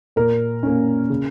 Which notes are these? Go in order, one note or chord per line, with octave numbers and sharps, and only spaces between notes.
A#2 A#4
A#3 C#4
C#3